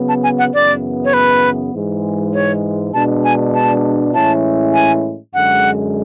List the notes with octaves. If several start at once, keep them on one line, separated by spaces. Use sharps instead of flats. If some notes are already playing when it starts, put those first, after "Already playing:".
Already playing: C#3 F#3 B3
A5
G#5
F#5
F#2 C#3 E3 B3 D5
C#5
B4
G#2 E3 G#3
C#5
B2 G#3 D4 A5
G#5
A5
A2 E3 G#3 C#4 E4 A5
G#5
F#2 D3 G#3 F#5